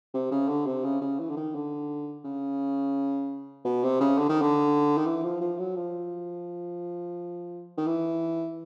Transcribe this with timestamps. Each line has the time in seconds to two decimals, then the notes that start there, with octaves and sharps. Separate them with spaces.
0.14 C3
0.31 C#3
0.49 D3
0.67 C3
0.84 C#3
1.01 C#3
1.19 E3
1.30 D3
1.37 D#3
1.55 D3
2.25 C#3
3.65 B2
3.83 C3
4.01 C#3
4.18 D3
4.29 D#3
4.41 D3
4.98 D#3
5.06 E3
5.23 F3
5.41 F3
5.59 F#3
5.76 F3
7.78 D#3
7.87 E3